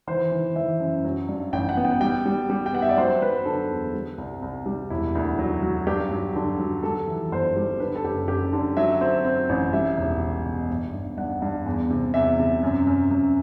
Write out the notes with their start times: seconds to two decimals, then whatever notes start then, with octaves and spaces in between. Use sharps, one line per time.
0.07 E3 C5
0.32 E3
0.56 E3 E5
0.80 F#2
1.05 F#3
1.29 G2
1.53 A1 G5
1.69 F#5
1.77 B3
1.85 G5
2.00 G3 G5
2.26 G3
2.50 G3
2.66 G5
2.73 B3 F#5
2.82 E5
2.89 D5
2.98 F#3 C5
3.22 F#3 B4
3.46 D3 A4
3.70 E2
3.94 G3
4.18 C2
4.42 C2
4.66 G3
4.90 E1 E4
5.15 D2
5.39 F#3
5.63 F#3
5.87 G2 G4
6.11 F#3
6.36 D3
6.60 F#3
6.83 G3 A4
7.07 E3
7.31 G1 C5
7.56 G3
7.80 D3 B4
7.96 A4
8.04 F#1 G4
8.28 F#2 G4
8.53 D3
8.77 F#3 E5
9.01 C4
9.25 C4
9.49 A1
9.73 G3 E5
9.97 E1
10.21 E1
10.46 B2
10.70 G1
10.94 G2
11.18 G2 F#5
11.42 G2
11.66 E2
11.90 C3
12.14 E2 E5
12.39 C3
12.63 F#2
12.87 F#2
13.11 F#2